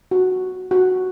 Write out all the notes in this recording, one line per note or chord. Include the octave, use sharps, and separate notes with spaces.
F#4
F#4